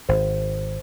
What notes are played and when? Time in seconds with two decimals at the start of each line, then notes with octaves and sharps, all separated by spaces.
0.09 G#1 C5